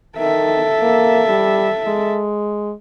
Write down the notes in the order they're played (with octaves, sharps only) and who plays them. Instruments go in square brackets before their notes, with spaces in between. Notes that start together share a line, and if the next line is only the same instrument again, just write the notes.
[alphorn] D#3 [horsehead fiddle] A4 E5
[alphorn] A#3
G3
G#3